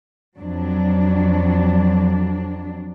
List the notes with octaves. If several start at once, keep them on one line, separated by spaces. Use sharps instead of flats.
F2 F#3 D4